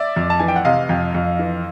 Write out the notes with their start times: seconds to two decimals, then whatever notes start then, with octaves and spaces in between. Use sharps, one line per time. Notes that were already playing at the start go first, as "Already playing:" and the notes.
Already playing: D5 E5
0.16 F2
0.30 A5
0.39 E3 G#5
0.48 G5
0.56 F#5
0.65 C3 D#5 F5
0.89 F2
1.15 F2
1.39 E3